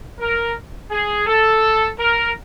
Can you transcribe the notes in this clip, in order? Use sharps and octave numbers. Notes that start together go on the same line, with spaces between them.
A#4
G#4
A4
A#4